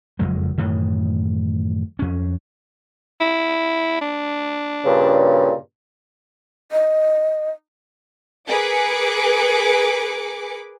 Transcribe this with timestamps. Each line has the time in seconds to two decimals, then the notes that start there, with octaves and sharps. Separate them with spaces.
0.19 F#1 F2 F#3 G#3
0.58 F#2 A2 D#3 E3
1.99 F2 C#4
3.21 E4
4.01 D4
4.85 G2 A#2 C#3
6.72 D#5
8.48 G#4 A#4 B4 D6 C#7